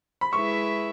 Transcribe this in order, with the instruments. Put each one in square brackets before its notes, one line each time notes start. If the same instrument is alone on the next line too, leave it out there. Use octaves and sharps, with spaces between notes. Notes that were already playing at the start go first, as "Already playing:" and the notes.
[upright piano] B5
[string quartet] G#3 E4 G#4 B4 E5 [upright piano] C#6